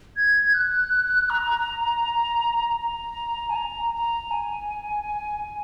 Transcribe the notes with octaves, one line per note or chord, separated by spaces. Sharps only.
G#6
F#6
A#5
A#5
G#5
A#5
A#5
G#5